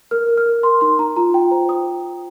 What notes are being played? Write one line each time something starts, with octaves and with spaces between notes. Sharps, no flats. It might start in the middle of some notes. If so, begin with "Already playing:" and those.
A#4 F6
A#4
F6
A#4
A#4 C6
D#4 C6
D#4 A#5
F4 A#5
F4 G5
C5 A#5
C5 D#6